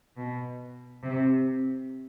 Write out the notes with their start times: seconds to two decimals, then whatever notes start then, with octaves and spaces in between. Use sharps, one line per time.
0.17 B2
1.03 C3